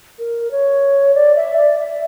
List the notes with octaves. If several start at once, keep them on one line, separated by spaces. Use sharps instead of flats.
A#4
C#5
D5
E5
D5
E5